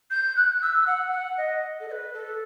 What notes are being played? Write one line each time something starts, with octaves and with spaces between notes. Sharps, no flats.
G6
F#6
E6
F#5
F#5
D#5
A4
D#5
B4
A4